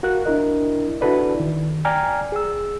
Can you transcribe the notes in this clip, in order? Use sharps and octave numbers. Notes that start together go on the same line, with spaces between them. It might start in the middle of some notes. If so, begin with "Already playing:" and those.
F#4 A#4 F5 F#6
D4 E4 A#4 D#5
D4 E4 F#4 A4 B4 D5
D#3
D5 G5 G#5 A#5 D6 F6
G#4 E6